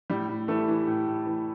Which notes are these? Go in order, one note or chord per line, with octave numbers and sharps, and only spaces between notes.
A2 G3 G4
A2
E3 A3 A4
E3
A2
A2
E3